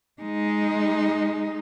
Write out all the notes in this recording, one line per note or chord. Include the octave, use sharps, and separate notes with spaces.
G#3 D#4